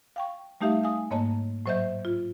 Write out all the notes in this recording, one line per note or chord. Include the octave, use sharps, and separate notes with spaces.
F5 G5 C#6
G3 A3 D#4 G4 E5 F5
F5 G#5 D#6
G#2 A#3 C#5 D#5 A5
A2 F#3 C5 D#5 E5 G6
F4